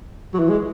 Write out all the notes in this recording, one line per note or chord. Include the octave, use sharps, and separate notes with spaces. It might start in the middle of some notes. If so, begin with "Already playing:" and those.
F#3
E3
G#3